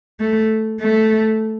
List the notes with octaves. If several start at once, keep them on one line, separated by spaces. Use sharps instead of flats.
A3
A3